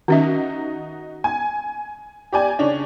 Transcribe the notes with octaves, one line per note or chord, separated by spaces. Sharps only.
D#3 C#4 D#4 F#4 E5
G#5
G4 D5 G#5
C#3 C#4 D4